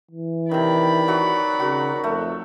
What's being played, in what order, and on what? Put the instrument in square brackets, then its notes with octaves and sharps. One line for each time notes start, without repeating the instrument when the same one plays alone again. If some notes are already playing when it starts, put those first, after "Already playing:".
[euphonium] E3
[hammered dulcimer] C3 D#3 [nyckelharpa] D5 B5
[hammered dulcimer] F#3 F#4
[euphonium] C#3 [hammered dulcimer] F#4 A#4
[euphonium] F2 [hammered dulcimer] A3